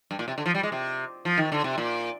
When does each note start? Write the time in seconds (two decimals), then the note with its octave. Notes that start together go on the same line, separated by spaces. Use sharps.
0.11 G2
0.19 A#2
0.28 C3
0.38 D3
0.46 F3
0.55 G3
0.63 G#3
0.72 C3
1.25 F3
1.38 D#3
1.52 D3
1.64 C3
1.78 A#2